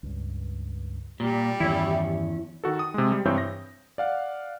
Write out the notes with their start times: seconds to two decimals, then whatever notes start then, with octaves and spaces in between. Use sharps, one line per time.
0.03 C#2 G2
1.20 A#2 G3
1.60 E2 G2 D#3 C#4 E4
2.64 D#3 F#4 A4
2.79 D#6
2.94 C3 G#3
3.12 G3
3.25 G2 E3 C4 C#5 E5 G6
3.38 A#6
3.98 D5 F5 F#5